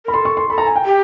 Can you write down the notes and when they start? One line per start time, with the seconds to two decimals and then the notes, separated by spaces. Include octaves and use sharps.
0.05 A#4 B5
0.13 A4 C6
0.25 C#6
0.37 C6
0.49 A4 B5
0.58 A#5
0.66 G#5
0.76 G5
0.85 G4